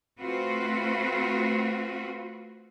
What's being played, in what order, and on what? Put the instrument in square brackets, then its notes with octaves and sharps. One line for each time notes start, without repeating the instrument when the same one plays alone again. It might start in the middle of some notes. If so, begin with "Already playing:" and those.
[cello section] A3 C4 F4 F#4 B4